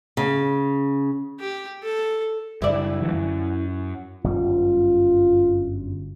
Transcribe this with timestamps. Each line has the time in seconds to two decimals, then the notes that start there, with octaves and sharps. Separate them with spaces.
0.17 C#3
1.40 G4
1.83 A4
2.62 F#1 G3 E4 D5
3.01 D3 E3 F#3
3.13 F#2
4.24 G1 F#2 G3 F4